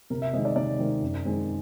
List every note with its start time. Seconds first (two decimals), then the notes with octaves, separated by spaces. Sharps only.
0.10 C3 A#4
0.22 E5
0.33 D#3 G#3 C4 D#5
0.45 D5
0.56 C3 D5
0.79 D#3 G#3 C4
1.02 F#2
1.25 D#3 G#3 C4